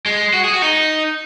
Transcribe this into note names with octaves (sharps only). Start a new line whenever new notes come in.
G#3
F#4
G#4
F#4
D#4